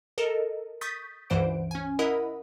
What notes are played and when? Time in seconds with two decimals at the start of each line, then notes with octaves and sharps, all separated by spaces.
0.18 A4 A#4 D#5
0.81 C#6 D#6 G6 A6 B6
1.30 C#2 G2 E3 C5 F#5 D7
1.71 C#4 G#5
1.99 E4 A#4 D#5 F#5 B5 D#6